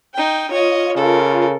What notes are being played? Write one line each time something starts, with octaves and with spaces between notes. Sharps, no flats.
D#4 G5
F4 C#5 D#5
C#3 A4 A#4